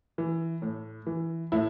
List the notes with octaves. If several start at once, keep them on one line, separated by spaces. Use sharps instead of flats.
E3
A2
E3
A2 E4